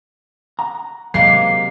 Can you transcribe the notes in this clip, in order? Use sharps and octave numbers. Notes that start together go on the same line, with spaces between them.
F#5 A#5
C3 F#3 G#3 A#3 C7